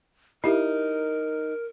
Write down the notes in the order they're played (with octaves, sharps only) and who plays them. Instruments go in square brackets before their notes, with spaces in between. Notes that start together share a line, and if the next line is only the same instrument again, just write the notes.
[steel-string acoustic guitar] D#4 [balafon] E4 G4 E5 [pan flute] A#4